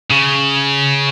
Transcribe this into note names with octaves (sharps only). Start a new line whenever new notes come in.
C#3